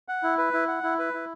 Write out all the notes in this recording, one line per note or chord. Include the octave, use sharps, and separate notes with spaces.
F#5
E4
B4
E4
F#5
E4
B4
E4